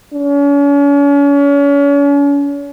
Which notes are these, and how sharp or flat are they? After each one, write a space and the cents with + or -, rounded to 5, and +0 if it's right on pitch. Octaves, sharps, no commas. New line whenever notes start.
C#4 +40